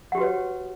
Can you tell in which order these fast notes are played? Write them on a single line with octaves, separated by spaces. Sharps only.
F#5 G4 F#4 B4 C#5